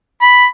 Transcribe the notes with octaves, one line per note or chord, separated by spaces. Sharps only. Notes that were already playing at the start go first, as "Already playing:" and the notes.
B5